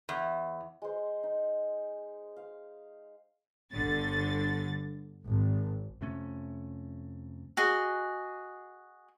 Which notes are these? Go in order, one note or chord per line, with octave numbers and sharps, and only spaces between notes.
E2
G#3 C5
D#4
F5
G1 D3 A6
G#1
F2 C3 A3 C#4
F#4 G#4 D#5